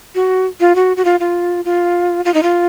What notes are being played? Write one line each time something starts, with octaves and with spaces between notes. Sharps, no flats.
F#4
F4
F#4
F#4
F4
F4
F4
F4
D#4
F4